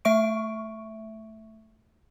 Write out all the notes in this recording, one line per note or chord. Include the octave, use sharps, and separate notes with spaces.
A3 E5 C#6 D7